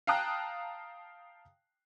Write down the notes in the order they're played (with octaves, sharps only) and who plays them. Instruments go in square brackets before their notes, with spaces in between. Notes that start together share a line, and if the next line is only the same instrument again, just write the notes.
[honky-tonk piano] F5 G5 A5 A#5 D#6 F#6